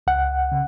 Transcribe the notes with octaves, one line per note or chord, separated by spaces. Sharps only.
C#2 F#5
C#3